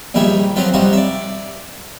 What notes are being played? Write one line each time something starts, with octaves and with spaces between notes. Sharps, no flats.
A#1 D#2 G3 D#4 G#4 E5
F3 F#3 C4 F4 B4
C3 F3 G3 D#4 F#4
D5 E5